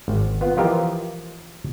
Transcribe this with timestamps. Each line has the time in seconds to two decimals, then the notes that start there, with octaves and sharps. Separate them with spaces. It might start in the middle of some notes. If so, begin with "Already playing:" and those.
0.08 G#1
0.41 B3 F4
0.57 E3 F3 F4 G4 A#4 D#5